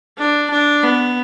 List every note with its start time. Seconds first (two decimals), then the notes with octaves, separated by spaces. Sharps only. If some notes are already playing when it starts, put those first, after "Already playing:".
0.18 D4
0.51 D4
0.83 B3